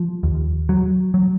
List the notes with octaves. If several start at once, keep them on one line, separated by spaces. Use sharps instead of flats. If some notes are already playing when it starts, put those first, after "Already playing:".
Already playing: F3
D#2
F#3
F#3